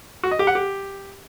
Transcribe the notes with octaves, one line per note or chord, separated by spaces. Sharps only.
F#4
D#5
G4
F#5
G4